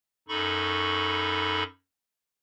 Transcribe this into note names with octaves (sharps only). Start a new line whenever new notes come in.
F#2 D#4 A4 B5 C#6